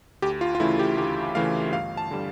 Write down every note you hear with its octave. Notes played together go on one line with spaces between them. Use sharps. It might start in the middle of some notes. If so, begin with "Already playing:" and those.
D2 G4
F4
F4
C#3 E3 A3 E4
G4
D2 G4
C#3 E3 A3 F5
G1 F5
A5
D3 G3